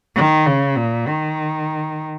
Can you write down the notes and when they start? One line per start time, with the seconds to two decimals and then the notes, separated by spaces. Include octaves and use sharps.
0.16 D#3
0.46 C#3
0.77 A#2
1.08 D#3